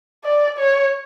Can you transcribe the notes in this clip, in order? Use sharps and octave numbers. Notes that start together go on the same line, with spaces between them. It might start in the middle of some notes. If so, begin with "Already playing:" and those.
D5
C#5